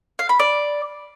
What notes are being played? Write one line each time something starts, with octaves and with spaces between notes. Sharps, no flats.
F5
B5
D5